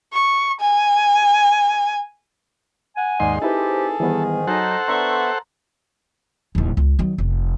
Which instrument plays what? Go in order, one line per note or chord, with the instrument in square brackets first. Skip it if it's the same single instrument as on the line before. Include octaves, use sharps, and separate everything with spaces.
[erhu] C#6
G#5
[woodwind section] F#5 G#5
[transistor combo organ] D#2 G#2 C6 [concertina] G#4 [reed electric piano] D5 D#5
[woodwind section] C4 G4 [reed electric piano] D#4 E4 B4 [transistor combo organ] A4
[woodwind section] G#2 D#3 [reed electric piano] E3 G3 B3
[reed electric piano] F#3 [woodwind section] D#4 [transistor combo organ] A4 C5 F#5
[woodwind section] D3 D4 C#6 [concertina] B3 E5 [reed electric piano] A#5 C6
[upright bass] D1 D#2
C#2
D#3 F#3
F1